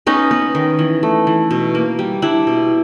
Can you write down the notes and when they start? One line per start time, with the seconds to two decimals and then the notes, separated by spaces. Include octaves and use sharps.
0.07 B3 C#4 D#4
0.31 B3
0.55 D#3
0.79 E3
1.03 A3
1.27 E3
1.51 B2
1.75 A#3
1.99 G3
2.22 G3 D4 E4
2.47 B2